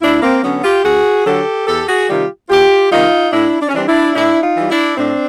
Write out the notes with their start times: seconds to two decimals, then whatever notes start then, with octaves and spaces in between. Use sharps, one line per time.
0.02 D2 D4 E4
0.22 A#3 C4
0.43 D3 F#3 B3 C#4
0.63 F4 G4
0.84 D2 F#4 G#4
1.26 D3 F#3 G4 A4
1.67 E2 G4 A4
1.88 F#4 G#4
2.09 C3 D#3 G3 F4 G4
2.49 E2 F4 G4
2.91 C3 D#3 G3 D#4 F4
3.32 A2 D4 E4
3.60 D4
3.68 C#4
3.74 E3 G3 C4 D4
3.88 D4 E4
4.15 A2 D4 E4
4.42 D#4 F4
4.57 E3 G3
4.71 D4 E4
4.98 A2 C4 D4